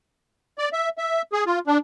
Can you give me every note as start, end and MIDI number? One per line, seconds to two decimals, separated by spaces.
0.58 0.69 74
0.73 0.89 76
0.98 1.22 76
1.33 1.44 68
1.46 1.59 65
1.67 1.78 62